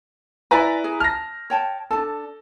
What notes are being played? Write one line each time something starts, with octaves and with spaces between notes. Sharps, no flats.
E4 B4 D5 E5 G#5 A#5
G#4
A5 F6 A#6
C#5 G5 A5
D4 A4 A5